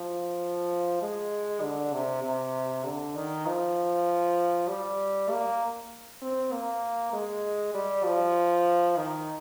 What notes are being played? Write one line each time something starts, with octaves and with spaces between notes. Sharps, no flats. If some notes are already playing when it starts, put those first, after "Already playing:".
Already playing: F3
G#3
D3
C3
C3
D3
D#3
F3
G3
A#3
C4
A#3
G#3
G3
F3
D#3